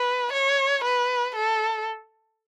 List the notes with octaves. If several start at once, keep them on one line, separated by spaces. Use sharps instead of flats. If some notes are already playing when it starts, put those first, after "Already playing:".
Already playing: B4
C#5
B4
A4